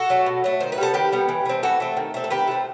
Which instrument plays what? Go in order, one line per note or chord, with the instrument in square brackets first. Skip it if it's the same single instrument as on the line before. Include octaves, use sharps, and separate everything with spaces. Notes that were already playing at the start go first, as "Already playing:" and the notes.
Already playing: [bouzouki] F#4 A4
F#3 A3
B2
F#3 A3
D#3 C5
B4
G3 B3 A4
D#3 G4 B4
G3 B3
E3
A3 C4
E3 F#4 A4
A3 C4
D#3
A3 C4
A4
D#3 G4 B4
A3 C4